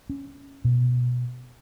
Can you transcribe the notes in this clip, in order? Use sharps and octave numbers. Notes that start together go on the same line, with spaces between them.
C#4
B2